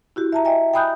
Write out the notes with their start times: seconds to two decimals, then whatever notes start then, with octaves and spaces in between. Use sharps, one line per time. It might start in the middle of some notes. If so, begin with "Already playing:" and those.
0.16 E4 F#4 G4
0.32 E5 A5 A#5
0.45 D#5 E5 G5 G#5 A#5
0.74 G5 G#5 B5 D#6 F#6 G6